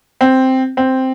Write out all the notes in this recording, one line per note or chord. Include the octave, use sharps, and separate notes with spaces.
C4
C4